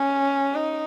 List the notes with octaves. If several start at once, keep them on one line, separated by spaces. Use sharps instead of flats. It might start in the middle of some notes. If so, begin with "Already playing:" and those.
Already playing: C#4
D#4